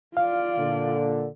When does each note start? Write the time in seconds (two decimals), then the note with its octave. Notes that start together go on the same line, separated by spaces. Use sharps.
0.17 F4 D5 F5
0.59 A#2 D3